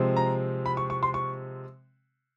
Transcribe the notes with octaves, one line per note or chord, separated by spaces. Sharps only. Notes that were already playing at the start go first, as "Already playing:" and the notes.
Already playing: C3 F3 G#3 C4
A#5
B5
C#6
C#6
C6
C#6